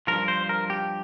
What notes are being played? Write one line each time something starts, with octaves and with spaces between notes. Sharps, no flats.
G2 F3 A#4
C5
A#4
G4